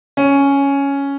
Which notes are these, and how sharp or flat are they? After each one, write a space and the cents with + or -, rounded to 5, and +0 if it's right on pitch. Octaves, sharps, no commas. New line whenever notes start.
C#4 +5